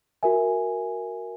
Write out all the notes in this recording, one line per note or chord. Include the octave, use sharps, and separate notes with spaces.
F#4 A#4 E5 G#5